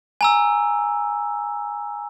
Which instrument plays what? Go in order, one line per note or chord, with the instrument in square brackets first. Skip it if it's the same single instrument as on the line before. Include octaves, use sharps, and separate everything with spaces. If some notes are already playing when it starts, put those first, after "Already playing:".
[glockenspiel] G#5 A#5 E6